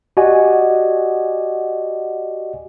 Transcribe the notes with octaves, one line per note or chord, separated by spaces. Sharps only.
F#4 G4 D5 D#5 F#5 G#5